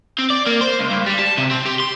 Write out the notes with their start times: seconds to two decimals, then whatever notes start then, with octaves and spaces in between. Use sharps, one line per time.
0.19 C4
0.30 D5
0.47 A#3
0.61 C5
0.79 C#2
0.91 G2
1.06 G3
1.19 A5
1.38 C3
1.51 C4
1.66 G4
1.80 C6